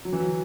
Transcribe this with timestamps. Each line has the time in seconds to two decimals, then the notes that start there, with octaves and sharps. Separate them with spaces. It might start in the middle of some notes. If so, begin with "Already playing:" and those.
0.05 F#3
0.13 E3
0.20 F#3